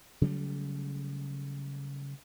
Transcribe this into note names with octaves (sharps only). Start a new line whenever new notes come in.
C#3 F#3 G3 A3